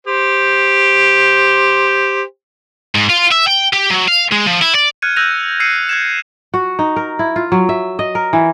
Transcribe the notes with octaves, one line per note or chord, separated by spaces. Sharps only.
G4 C5
G#2
F4
E5
G5
G4
F#3
F5
G#3
F3
E4
D5
F6 F#6 G#6 C#7 D#7
E6 F#6 G6 A#6 D#7 F7
E6 G6 C7 C#7 D#7
F#6 G#6 E7
F#4
D#4
A#4
E4
F4
F#3
E5
D#5
A#4
E3